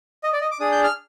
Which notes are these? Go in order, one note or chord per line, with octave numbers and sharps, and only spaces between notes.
D#5
D5
D#5
D6
D4 G#4 D#6
G6
F6